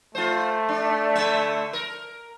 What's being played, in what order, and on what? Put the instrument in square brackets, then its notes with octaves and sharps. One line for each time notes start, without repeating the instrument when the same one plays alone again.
[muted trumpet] A3 [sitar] F4 C5
[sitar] D4
D3 E5
A#4